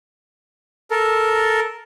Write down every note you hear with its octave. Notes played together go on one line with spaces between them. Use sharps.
A4 A#4